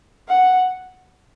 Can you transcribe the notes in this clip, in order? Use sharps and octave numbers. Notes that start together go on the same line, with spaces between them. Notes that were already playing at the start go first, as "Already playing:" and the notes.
F#5